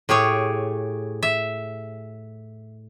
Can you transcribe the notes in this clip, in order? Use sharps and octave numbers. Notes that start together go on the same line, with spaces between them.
A2 G4 G#4 C#5
E5